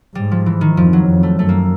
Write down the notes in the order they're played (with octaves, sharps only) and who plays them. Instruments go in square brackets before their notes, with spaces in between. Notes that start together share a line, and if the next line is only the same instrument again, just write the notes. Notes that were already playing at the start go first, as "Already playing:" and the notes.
[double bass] G#2 [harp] G3
[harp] F3
E3
D#3
[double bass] F2 [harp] F3
[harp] F#3
[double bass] F2
[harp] A3
[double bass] F#2 [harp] A3
[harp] A#3